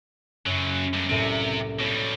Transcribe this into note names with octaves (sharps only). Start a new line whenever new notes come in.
F#2 C#3 F#3
G2 D3
C2 A2 C3 A#3
B2 G3 C#5